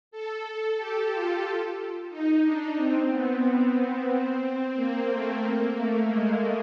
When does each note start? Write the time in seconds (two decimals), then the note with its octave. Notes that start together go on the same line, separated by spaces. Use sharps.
0.11 A4
0.78 G4
1.11 F4
2.10 D#4
2.43 D4
2.77 C4
3.09 B3
3.42 C4
3.76 B3
4.09 C4
4.76 A#3
5.09 A3
5.42 A#3
5.75 A3
6.08 G#3